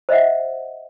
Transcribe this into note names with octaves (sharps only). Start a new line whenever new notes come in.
C5 D#5 E5 F#5